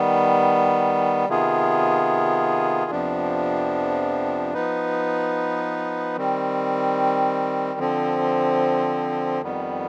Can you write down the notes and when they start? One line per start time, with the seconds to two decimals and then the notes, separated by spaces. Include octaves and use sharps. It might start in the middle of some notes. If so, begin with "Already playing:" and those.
Already playing: D#3 G3 B3
1.28 C3 D#3 B3 F4 G#4
2.91 F2 C3 F3 B3 D4
4.54 F3 B3 D#4 B4
6.17 D#3 G3 C4
7.79 D3 F3 C4
9.41 F2 D#3 G3 B3